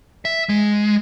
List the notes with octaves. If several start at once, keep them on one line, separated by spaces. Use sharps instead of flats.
E5
G#3